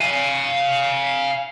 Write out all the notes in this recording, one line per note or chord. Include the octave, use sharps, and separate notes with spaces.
F5 G#5